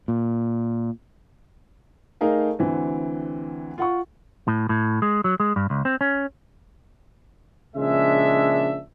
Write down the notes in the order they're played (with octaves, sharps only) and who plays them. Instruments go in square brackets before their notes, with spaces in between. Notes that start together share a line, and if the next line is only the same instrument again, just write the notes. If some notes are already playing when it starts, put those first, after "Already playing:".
[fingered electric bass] A#2
[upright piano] A3 D#4 G#4 A#4 F5
D2 D3 E3 C4
F4 F#5 C#6
[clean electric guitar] A2
A2
G#3
F#3
G#3
G2
C#2
C4
C#4
[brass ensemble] A#1 C#3 G#3 D4 E5